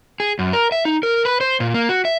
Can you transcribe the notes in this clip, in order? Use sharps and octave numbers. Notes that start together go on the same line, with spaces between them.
G#4
F#2
A#4
E5
D#4
A#4
B4
C5
A#2
A#3
F#4
E5